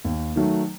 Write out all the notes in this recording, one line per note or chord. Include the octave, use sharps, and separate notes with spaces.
D#2
D#3 F#3 A3